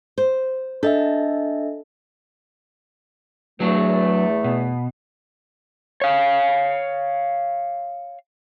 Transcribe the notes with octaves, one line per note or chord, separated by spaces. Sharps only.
C5
D4 A4 D#5 E5
E2 F#3 A3 D4
B2
C#5 F5